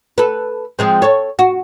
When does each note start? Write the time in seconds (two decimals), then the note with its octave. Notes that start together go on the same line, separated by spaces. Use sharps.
0.18 A4 B4
0.79 F3 G#3 C4
1.02 A4 C#5
1.39 F#4